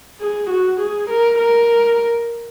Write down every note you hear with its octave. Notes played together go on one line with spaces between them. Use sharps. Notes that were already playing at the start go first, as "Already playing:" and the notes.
G#4
F#4
G#4
A#4
A#4